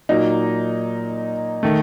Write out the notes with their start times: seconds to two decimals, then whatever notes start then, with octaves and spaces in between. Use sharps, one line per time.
0.09 A#2 F#3 A#3 D#4
1.63 D#3 A3